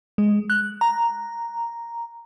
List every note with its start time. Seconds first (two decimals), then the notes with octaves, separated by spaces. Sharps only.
0.18 G#3
0.50 F#6
0.81 A#5